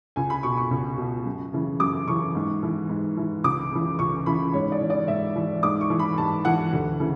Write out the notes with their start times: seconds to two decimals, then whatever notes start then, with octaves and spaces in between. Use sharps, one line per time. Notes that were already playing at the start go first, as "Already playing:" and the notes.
0.16 C#2 G#5
0.30 B5
0.43 B2 C#6
0.57 C#6
0.71 C#2
0.98 B2
1.25 F#2
1.53 C#3 E3
1.80 F#2 D6
2.07 C#3 E3 C#6
2.35 G#2
2.63 E3
2.89 G#2
3.17 E3
3.44 C#2 D6
3.71 C#3 E3
3.99 C#2 C#6
4.26 C#3 E3 B5
4.53 G#2 C#5
4.72 D5
4.81 E3
4.90 D5
5.08 G#2 E5
5.36 E3
5.63 G#2 D6
5.81 C#6
5.90 E3
5.99 B5
6.18 G#2 A5
6.45 E3 F#5
6.73 D2
7.00 C#3 E3